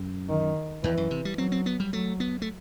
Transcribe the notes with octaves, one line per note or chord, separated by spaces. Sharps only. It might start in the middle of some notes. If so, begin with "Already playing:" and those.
Already playing: F#2
D#3
E2 E3
F#2
C3
G3
F#3 C4
C4
B3
G3
F#3 A3
B3
A3